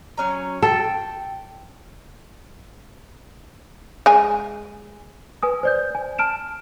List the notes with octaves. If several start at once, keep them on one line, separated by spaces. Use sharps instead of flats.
F#3 C#4 A#5
A4 G5
G#3 G#5
B4 G#5 D#6
C5 D5 G6
G#5
A5 F6 D7 E7